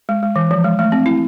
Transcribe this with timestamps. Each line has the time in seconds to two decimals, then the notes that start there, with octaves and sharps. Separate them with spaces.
0.09 G#3
0.23 G#3
0.36 E3
0.51 F3
0.64 G#3
0.79 A3
0.92 C4
1.06 E4